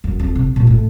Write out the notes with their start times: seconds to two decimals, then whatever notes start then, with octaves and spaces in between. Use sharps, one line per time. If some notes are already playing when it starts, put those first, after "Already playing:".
0.04 F#2
0.19 F2
0.35 C3
0.56 A#2
0.67 A2